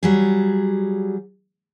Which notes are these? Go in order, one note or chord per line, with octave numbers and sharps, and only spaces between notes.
F#3 G3 G#4